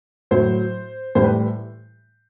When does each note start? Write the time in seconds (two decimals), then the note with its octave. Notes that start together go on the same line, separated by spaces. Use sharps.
0.31 A2 F#3 C5
1.15 A2 E3 G3 C5
1.24 B4